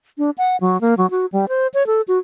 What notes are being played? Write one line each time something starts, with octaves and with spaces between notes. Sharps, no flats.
D4
F#5
F#3
A#3
F#3
F#4
G3
C5
C#5
A4
F#4